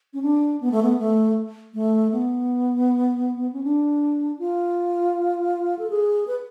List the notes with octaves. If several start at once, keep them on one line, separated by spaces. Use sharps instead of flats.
C#4
D4
B3
A3
B3
A3
A3
B3
C#4
D4
F4
A4
G#4
B4